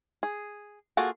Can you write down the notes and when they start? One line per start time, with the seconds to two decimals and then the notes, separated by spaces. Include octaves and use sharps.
0.23 G#4
0.97 A#3 F4 F#4 G#4 A4